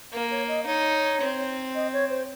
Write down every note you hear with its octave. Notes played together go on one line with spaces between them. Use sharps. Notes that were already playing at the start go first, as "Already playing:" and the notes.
A#3 A#4
C#5
D#5
D#4 C#5
C4
D#5
C#5
C5